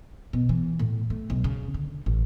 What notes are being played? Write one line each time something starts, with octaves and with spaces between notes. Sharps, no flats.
B2
E3
A2
A3
B1
C#3
D3
A1